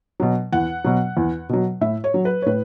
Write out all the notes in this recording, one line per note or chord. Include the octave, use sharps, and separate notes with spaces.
B2 F#3
E2 F#5
B2 F#3
E2
B2 F#3
A2 E5
C#5
F#3
B4
C#5
A2 B4